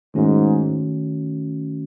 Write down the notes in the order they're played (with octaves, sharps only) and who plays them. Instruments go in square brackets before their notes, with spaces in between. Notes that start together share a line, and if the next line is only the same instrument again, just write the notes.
[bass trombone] G#2 [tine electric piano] D#3 A3 C#4 F#4